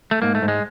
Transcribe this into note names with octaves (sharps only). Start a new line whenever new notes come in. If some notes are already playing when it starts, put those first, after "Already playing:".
A3
G#2 A#3
A3
G#2
G#3